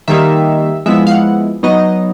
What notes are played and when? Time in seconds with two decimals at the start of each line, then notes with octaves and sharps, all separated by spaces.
0.08 D#3 G3 A#3 D#4 E5
0.86 F3 G#3 B3 E4 E5
1.07 F5
1.11 F#5
1.63 F#3 B3 D#4 D#5